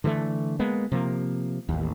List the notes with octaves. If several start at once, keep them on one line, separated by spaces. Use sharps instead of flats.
D3 E3 G3 A3
G#3 A#3 B3
C3 F3 A#3
A1 D#2